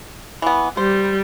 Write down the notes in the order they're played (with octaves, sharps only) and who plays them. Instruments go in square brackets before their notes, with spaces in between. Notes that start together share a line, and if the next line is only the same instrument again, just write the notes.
[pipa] E3 B3
[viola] G3 [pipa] C5